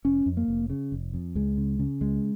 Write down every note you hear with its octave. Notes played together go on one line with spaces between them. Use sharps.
F1 C#4
F2
A#3
F1
C#3
F1
F2
C#2 G#3
C#3
C#3
C#2 G#3